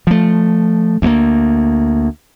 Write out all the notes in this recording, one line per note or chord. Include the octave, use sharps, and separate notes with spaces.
F3 A3
D2 A3 A#3